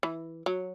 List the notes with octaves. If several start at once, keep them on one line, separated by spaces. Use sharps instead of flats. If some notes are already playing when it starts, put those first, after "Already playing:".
E3
F#3